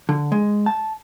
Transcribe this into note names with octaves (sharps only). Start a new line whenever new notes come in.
D3
G#3
A5